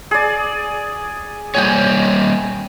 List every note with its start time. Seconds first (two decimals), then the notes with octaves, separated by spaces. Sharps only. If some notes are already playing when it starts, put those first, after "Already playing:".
0.11 G#4 D5
1.55 G3 A#3 C#5 G5 G#5